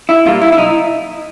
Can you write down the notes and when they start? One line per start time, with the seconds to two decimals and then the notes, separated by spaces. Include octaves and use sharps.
0.09 E4
0.26 A#2 G3 A#3 F4
0.42 E4
0.52 E4
0.58 B1 D#4